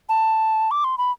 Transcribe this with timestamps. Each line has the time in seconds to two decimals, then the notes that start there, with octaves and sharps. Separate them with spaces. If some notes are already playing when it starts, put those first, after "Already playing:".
0.09 A5
0.71 D6
0.84 C6
0.98 B5